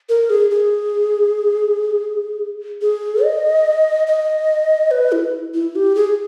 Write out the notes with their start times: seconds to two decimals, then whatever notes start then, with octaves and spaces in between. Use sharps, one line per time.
0.09 A#4
0.30 G#4
0.51 G#4
2.82 G#4
3.23 D#5
4.07 D#5
4.91 B4
5.12 E4
5.54 E4
5.76 G4
5.95 G#4